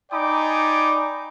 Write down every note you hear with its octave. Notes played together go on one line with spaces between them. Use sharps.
D#4 D5 G5 G#5 B5 D6